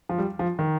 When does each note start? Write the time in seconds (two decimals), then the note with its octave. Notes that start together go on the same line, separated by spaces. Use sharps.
0.09 F3
0.18 G3
0.39 F3
0.59 D#3